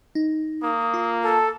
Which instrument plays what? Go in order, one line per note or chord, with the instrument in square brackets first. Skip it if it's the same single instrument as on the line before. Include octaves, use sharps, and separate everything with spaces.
[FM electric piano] D#4
[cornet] A#3 [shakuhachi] D#6
[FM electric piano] F4
[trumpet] A4 [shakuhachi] A5